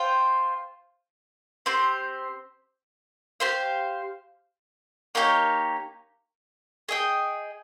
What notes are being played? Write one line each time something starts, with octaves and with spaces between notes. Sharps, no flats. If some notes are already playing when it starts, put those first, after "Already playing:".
Already playing: F4 C5 G5
C4 G4 C5
G4 C5 F5
A#3 D#4 G4 C#5
G#4 D#5 G5